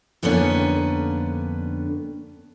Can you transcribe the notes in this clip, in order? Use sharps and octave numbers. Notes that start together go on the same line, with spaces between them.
F2 D3 A#3 B3 C#4 D4